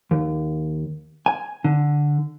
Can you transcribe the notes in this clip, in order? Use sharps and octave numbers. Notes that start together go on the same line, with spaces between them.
D#2
G#5
D3